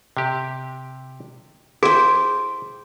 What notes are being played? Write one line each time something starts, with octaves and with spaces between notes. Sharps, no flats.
C3 G4
E4 G#4 C5 G5